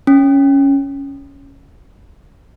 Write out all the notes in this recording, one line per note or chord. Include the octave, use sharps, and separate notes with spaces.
C#4